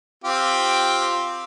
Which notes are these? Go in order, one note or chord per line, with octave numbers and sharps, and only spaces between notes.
C4 F4 G4